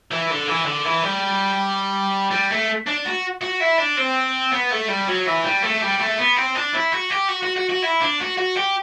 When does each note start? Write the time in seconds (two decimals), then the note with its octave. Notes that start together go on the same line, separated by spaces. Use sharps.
0.11 E3
0.30 D3
0.48 E3
0.66 D3
0.85 E3
1.03 G3
2.31 G3
2.51 A3
2.87 D4
3.05 F#4
3.42 F#4
3.61 E4
3.79 D4
3.98 C4
4.52 B3
4.72 A3
4.89 G3
5.08 F#3
5.26 E3
5.44 G3
5.63 A3
5.82 G3
6.00 A3
6.18 B3
6.37 C4
6.55 D4
6.73 E4
6.92 F#4
7.10 G4
7.28 F#4
7.43 F#4
7.56 F#4
7.70 F#4
7.83 E4
8.01 D4
8.21 F#4
8.38 F#4
8.57 G4